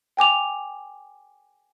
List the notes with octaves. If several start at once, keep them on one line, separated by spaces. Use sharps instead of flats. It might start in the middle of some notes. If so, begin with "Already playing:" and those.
G5 G#5 D6 F7